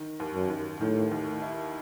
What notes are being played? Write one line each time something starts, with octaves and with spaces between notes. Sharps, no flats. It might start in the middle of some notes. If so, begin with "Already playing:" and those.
Already playing: D#3
D#2
F#2
D#2
A2 D#3
D#2
E4